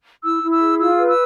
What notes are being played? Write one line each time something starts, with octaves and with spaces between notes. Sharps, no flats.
E4 E6
E4
E6
G#4
F4 E6
B4
E6